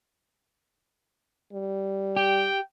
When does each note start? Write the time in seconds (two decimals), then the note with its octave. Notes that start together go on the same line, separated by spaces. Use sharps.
1.53 G3
2.16 G4 G5